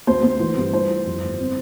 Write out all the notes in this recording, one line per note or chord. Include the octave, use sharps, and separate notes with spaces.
D2 C5
D2
E3
G2
E4 C5
E4
F2
G1
C4